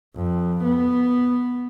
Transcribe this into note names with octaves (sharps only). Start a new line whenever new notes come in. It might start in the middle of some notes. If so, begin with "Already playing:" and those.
F2
B3